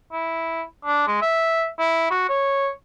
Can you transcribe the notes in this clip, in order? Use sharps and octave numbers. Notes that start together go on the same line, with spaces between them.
E4
D4
G#3
E5
E4
F#4
C#5